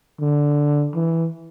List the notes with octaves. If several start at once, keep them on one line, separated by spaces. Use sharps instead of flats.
D3
E3